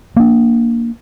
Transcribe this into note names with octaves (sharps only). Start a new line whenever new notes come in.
A#3 D4